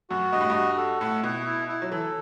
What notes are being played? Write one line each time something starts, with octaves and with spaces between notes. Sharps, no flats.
F#2 F#4
G2 D#5
A2
G2
F#4
A4
A2 F#5
B2 E4
E4
E4
F#3
E3 A4